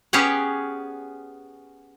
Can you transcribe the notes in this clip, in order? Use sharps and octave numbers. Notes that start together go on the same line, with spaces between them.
B3 C#4 G4 G#4 C#5 F#5